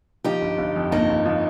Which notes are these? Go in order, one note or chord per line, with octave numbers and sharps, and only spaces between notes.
F3 D#4 G4
G1
G1
F2
G1 A#3 D#4
G1
F3